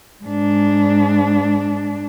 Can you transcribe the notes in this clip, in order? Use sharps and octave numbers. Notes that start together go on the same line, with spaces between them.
G#2 D4